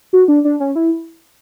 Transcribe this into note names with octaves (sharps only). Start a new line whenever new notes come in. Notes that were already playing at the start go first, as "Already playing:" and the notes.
F#4
D4
D4
C#4
E4